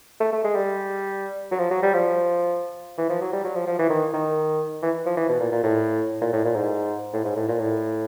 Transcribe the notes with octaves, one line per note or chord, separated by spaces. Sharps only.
A3
A3
G#3
G3
F#3
F3
F#3
G3
F3
E3
F3
F#3
G3
F#3
F3
F3
E3
D#3
D#3
E3
F3
E3
B2
A#2
A#2
A2
A#2
A2
A#2
G#2
A2
G#2
A2
A#2
A2